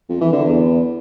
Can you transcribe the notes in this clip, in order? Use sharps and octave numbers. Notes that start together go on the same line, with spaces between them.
F2
E3
D3
E2